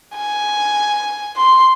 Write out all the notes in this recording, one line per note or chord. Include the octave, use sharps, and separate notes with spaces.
G#5
C6